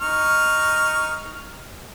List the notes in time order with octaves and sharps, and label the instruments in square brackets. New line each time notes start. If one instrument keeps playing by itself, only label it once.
[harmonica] D#4 C#6 F6